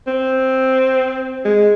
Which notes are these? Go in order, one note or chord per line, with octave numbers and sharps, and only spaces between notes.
C4
G#3